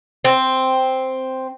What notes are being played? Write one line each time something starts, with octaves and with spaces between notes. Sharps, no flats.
C4